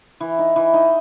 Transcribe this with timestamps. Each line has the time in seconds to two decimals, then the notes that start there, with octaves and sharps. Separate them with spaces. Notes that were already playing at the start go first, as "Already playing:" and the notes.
0.20 E3
0.39 D#4
0.56 E3
0.74 D#4